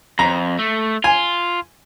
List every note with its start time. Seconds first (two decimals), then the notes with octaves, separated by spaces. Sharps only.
0.19 F2 A#5
0.59 A3
1.04 F4 G#5